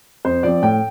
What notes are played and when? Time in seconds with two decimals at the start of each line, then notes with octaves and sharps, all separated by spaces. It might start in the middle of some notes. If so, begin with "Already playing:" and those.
0.25 F2 C5
0.43 F3 C4 D5
0.62 A2 G5